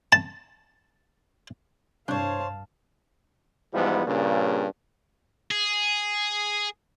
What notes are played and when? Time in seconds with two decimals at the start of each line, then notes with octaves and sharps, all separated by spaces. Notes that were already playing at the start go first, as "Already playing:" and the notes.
0.12 A5
2.08 C2 G2 D4 C5 C#5 F5 A5 F#6
3.73 G#2 E3 F3 G3 B3
4.06 G2 A#2 C#3
5.51 G#4